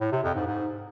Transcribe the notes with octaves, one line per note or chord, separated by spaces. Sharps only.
A2
C3
F2
G#2
G#2